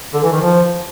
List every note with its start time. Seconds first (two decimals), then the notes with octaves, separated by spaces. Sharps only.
0.14 D3
0.23 E3
0.32 D#3
0.41 F3